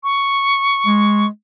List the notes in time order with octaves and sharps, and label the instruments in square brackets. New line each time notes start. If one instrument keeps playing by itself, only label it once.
[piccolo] C#6
[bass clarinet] G#3